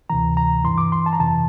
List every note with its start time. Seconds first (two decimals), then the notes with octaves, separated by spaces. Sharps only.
0.10 D2 C3 E3 A#5
0.37 A#5
0.64 G2 E3 C6
0.78 D6
0.92 C6
1.06 A5
1.13 A#5
1.19 F2 C3 E3 A5